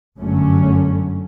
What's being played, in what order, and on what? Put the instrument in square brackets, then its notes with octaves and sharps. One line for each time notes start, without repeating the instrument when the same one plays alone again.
[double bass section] G1 F#2 D3 F#3 A3 C#4